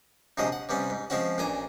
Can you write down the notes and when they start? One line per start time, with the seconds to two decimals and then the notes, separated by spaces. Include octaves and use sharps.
0.37 A#1 C3 F3 F#3 G#3 D#5
0.52 F#5
0.69 C3 G3 B3 C#4
0.90 G#2
1.10 F3 G#3 C4 C#4 F#4
1.38 A1 A#2 D4 G#5 A#5